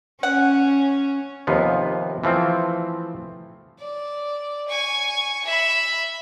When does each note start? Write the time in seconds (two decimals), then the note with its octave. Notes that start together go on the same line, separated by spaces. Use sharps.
0.23 C#4 F#5
1.47 D#2 C3 F3 B3
2.24 E3 F3 A3 C4
3.80 D5
4.69 G#5 C#6
5.45 E5 B5